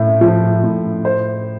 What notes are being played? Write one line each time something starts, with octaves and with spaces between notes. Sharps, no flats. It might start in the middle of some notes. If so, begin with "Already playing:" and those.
Already playing: A2
F3
A2
C5